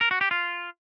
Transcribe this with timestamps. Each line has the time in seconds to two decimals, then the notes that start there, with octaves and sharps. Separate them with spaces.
0.01 A#4
0.11 F#4
0.21 G4
0.31 F4